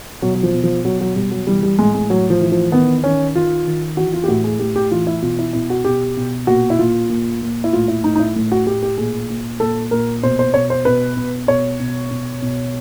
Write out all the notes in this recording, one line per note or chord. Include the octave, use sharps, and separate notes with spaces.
B2 F#3
F#3
F3
B2
F3
B2 F#3
F#3
B2 G3
F#3
E3 G3
G3
A2 G#3
G#3
A2 F#3
F3
E3
F3
D#3 B3
D#3 C#4
D#3 F4
D#3
E3 F#4
F4
G4
A2 F#4
G#4
A2 G4
G4
E3 F4
E4
B2 F4
E4
B2 E4
F#4
B2 G4
B2
A#2 F#4
E4
A#2 F4
A#2
A#2
E4
A2 F4
E4
A2 D#4
D#4
E4
A2
F#4
A2 G4
G4
A#2 G#4
A#2
A#2 A4
A#2 A#4
B2 C5
C5
B2 C#5
C5
B2 B4
B2
B2 C#5
B2
B2
B2